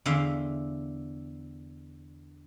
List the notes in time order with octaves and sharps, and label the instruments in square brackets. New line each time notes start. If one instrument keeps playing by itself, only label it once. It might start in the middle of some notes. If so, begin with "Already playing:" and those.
[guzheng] E2 D3 E5 F5